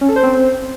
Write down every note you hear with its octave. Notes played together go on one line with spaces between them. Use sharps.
C#4
A4
C5
C4